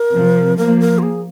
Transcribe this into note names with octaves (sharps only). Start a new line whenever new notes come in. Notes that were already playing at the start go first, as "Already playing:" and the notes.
Already playing: A#4
C3 F3
F3 A#3 A#4
A#4
F4
G#4